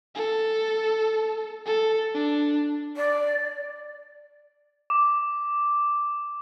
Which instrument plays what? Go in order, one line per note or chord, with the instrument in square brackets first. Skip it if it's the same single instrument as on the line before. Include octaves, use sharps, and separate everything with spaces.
[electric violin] A4
A4
D4
[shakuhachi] D5
[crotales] D6